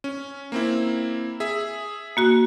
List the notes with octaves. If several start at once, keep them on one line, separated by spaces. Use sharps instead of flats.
C#4
A#3 C4 E4
G#4 E5
A#3 F#4 F#6